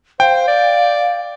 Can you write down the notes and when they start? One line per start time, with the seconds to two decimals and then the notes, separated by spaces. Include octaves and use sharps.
0.20 C5 F5 G5
0.48 D5